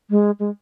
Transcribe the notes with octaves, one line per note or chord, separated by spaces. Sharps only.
G#3
G#3